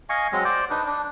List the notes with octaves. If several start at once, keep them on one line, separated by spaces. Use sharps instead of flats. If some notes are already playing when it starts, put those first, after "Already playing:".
D#5 F5 G#5 C#6
F#3 G#3 C4 D#5
C5 D5
D4 D#4 B4
D4